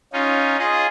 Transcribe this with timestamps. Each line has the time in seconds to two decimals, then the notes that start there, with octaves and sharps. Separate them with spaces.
0.13 C#4 D#4 F4
0.59 F4 G#4 D#5